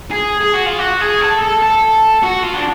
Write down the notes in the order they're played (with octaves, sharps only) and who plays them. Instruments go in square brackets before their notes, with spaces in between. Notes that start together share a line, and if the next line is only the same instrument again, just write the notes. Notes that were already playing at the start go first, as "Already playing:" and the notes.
[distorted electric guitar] G#4
G#4
F#4
F4
F#4
G#4
A4
A4
A4
F#4
F4
D4